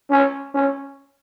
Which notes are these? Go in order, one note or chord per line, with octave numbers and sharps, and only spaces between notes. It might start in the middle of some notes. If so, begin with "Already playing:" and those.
C#4
C#4